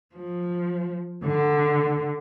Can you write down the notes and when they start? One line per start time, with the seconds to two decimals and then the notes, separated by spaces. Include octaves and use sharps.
0.15 F3
1.25 D3